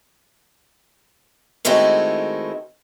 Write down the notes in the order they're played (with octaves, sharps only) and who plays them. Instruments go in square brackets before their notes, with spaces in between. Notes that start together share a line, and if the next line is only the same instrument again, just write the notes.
[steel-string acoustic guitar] D#3 G#3 A3 C4 E4 F#4